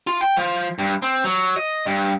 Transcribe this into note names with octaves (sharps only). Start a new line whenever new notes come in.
F4
G5
F3
G2
C4
F#3
D#5
G2